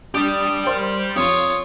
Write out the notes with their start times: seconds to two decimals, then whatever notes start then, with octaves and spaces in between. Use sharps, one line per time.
0.14 D4 G4 D5 D#6
0.67 A#4 C5
1.16 F2 F4 C#5 D#6